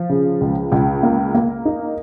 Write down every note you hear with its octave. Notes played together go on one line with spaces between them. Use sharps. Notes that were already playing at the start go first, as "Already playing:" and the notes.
Already playing: F3
C#3
C#2
C#2
A#3
A#3
D#4